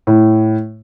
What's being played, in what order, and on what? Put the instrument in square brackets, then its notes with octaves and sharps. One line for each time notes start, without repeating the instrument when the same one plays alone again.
[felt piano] A2